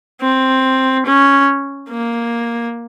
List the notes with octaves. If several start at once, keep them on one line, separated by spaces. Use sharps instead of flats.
C4
C#4
A#3